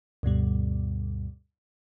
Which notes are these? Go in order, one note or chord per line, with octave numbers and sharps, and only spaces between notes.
D2 G2 B2 G3